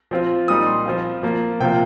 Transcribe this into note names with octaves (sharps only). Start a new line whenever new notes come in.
F3 C4 F4
A#2 G3 D#4 D#6
C6
F3 C4 F4
F3 A#3 F4
C3 F3 A#3 F4 G5